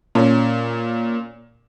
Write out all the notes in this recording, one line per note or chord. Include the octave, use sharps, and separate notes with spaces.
A#2 C#4